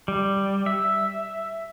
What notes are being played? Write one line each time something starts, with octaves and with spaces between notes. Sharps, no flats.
G3
E5